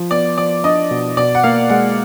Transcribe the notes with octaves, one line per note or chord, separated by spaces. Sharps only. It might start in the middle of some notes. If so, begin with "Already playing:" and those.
Already playing: F3
B3 D5
F3 D5
D4 D#5
B2
B2 D5
F#5
A#3 F5
G#3 F#5